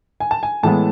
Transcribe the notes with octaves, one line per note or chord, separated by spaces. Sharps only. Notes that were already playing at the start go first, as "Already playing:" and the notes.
G#5
A5
G#5
A2 E3 G#3 B3 A5